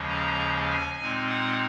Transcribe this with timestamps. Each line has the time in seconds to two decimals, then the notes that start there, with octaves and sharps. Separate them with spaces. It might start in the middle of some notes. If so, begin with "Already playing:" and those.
Already playing: D#2 C#3 F3 G#3 C#4
0.08 A#5
0.69 G#5
1.00 A#2 G#3 C4 D#4
1.30 F#5